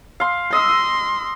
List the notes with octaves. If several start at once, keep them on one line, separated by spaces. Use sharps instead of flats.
F5 C6
D#5 C6 E6